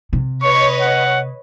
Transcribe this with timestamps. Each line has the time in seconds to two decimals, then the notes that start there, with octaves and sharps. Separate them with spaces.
0.13 C3
0.42 B4 C#5 D#5 C#6
0.82 F#5